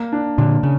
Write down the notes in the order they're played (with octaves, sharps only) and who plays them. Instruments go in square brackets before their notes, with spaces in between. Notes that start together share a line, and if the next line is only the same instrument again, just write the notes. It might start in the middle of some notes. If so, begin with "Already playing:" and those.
Already playing: [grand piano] A#3
D4
[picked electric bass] A#2 D3 [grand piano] D4
[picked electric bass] C#3